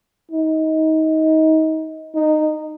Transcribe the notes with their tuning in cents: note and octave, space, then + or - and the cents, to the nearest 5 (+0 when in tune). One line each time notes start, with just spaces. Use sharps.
D#4 +25
D#4 -15